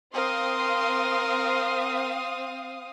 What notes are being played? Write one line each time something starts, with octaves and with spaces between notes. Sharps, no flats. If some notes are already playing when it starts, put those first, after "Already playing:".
C4 A#4 F5 C6 D#6